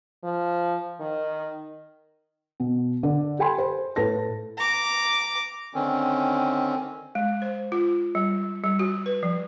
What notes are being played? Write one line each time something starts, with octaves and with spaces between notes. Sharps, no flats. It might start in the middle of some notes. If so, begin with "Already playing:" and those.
F3
D#3
B2
D3 D5
G4 A4 G5 G#5 B5 C6
C5
A2 A4 B4 A5 A#6
A#5 D6
D3 D#3 C4 C#4
G#3
C5
F4
G3
G3
F#4
B4
F3